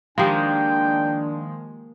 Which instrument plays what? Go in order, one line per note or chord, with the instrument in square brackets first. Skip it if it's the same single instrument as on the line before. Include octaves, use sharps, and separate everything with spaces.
[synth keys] D#3 F3 G#3 [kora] A#3 G4 [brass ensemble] D4 [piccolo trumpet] G5